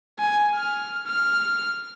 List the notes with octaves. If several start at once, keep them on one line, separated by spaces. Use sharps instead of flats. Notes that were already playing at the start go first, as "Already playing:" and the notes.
G#5
F6
F6